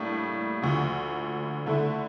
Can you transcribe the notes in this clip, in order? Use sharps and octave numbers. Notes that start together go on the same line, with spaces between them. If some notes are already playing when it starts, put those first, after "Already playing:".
Already playing: A2 G3 A#3 D4
D2 D3 F3
D3 A3 E4